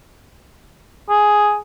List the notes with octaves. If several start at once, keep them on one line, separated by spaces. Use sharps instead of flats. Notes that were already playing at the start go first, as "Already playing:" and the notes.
G#4